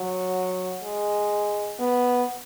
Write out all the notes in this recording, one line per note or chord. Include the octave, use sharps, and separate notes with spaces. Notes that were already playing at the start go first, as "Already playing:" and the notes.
Already playing: F#3
G#3
B3